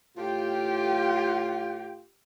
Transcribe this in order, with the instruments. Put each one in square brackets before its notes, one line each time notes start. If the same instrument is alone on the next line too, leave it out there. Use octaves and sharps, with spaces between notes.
[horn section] A2 F4 [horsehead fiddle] G4 G5